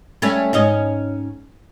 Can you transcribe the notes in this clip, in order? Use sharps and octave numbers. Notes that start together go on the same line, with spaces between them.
G3 A3 C#4
G#2 C#4 D#5